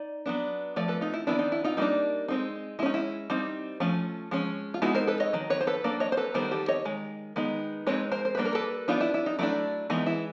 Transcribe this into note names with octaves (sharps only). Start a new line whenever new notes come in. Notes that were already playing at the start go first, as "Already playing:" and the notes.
Already playing: D#4 D5
F#3 B3 D4
F3 A3 D5
A4 B4
D#4 F4
E4
D#3 F#3 B3 D4 E4
D#4
E4
D#4 F4
G3 A#3 D4 D#4
G#3 C4 D#4
G#3 C#4 D#4 E4
E4
G3 C4 D#4
F3 A3 C#4
F3 G#3 C#4
F4
G#3 B3 D#4 E4 F#4
A#4 C5
A4 B4
C#5 D#5
D#3 F#3
B4 C#5
C5
A4 B4
F#3 A#3 D4 D5
C#5 D#5
C5
A4 B4
D#3 G3 B3 A#4 C5
G4 A4
C#5 D#5
D#3 G#3
D#3 G#3 B3 D#4
G#3 C4 D#4 B4 C#5
A#4 C5
C5
D#3 G3 A#3 D4 B4
A#4
A4 B4
G3 B3 D4 D#4 F4
E4
E4
D#4
F#3 A3 D4 E4
E3 G#3 B3 D#4
E4